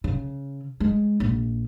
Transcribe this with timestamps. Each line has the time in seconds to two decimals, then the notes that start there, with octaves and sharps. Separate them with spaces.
0.04 C#3
0.80 G#3
1.20 A#1